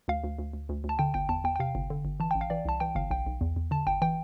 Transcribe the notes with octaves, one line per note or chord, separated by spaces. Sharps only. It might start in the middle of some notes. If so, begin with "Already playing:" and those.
D2 F5
D2
D2
D2
D2
D2
A5
D3 G5
G1 G5
E2 A5
E2 G5
G5
C3 F5
G1
D3
G1
E3 A5
G5
A1
F5
E3 D5
C2 A5
E3 G5
G1 F5
B1 G5
B1
E2
E2
D3 A5
G1 G5
E3 G5